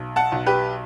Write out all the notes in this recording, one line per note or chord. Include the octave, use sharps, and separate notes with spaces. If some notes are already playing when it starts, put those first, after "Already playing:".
Already playing: B1
F#5 A5
B1
G4 B4